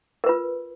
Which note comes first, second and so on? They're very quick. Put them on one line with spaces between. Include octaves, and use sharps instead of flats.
A#4 B4 F4